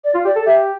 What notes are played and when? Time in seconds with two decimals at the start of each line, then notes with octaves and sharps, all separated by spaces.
0.04 D5
0.14 F4
0.25 G4 D5
0.36 A4
0.46 G4 E5